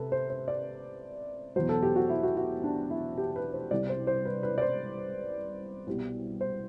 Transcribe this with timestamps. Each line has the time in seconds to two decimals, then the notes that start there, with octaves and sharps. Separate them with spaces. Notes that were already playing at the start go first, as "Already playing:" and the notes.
Already playing: C3 A4 B4
0.12 C5
0.30 C5
0.48 D5
1.56 E2 B2 F#3 C5
1.69 A4
1.83 G4
1.96 F#4
2.09 E4
2.23 F#4
2.37 F#4
2.64 D4
2.90 E4
3.18 G4
3.36 B4
3.53 C5
3.71 C2 C3 G3 D5
3.89 C5
4.07 C5
4.25 B4
4.43 B4
4.58 D5
4.62 C5
5.87 C2 B2 G3
6.41 C5